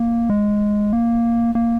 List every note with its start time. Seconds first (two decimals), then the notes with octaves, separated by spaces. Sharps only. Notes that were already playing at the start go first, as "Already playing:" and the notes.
Already playing: A#3
0.30 G#3
0.93 A#3
1.55 A#3